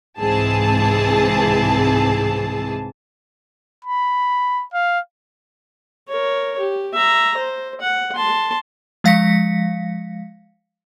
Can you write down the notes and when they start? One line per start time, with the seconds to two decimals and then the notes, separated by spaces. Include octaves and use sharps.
0.20 C2 G#2 E3 C4 G#4 A5
3.84 B5
4.73 F5
6.09 A#4 C#5
6.59 G4
6.94 E5 A#5
7.37 C5
7.81 F#5
8.15 A5 C6
9.04 F3 G#3 F5 A#6 B6 C#7